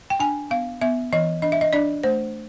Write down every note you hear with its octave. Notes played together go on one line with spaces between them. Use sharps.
G5
D4 G#5
B3 F5
B3 E5
E3 D#5
D4 D#5
E5
D#5
D4 D5
A3 C5